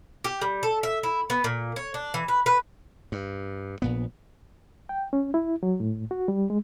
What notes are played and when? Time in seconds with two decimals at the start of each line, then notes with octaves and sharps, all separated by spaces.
0.24 G4
0.42 G3
0.63 A4
0.83 E5
1.03 E4
1.30 B3
1.44 A#2
1.76 C#5
1.94 D4
2.14 E3
2.28 B4
2.46 B4
3.12 G2
3.82 A#1 A#2 B3
4.89 G5
5.13 C#4
5.34 E4
5.63 F#3
5.80 A2
6.11 F#4
6.28 G3
6.50 G#3